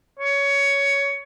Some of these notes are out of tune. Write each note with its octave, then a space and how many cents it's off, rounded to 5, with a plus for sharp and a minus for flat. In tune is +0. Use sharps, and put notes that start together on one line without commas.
C#5 +15